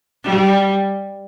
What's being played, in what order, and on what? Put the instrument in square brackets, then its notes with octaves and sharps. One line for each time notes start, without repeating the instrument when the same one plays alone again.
[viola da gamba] G3